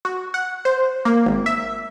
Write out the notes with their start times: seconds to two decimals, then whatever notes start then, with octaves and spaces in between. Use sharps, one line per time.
0.05 F#4
0.34 F#5
0.65 C5
1.05 A#3
1.26 G#1
1.46 E5